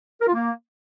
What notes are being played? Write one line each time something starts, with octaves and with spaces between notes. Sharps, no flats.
A#4
F4
A#3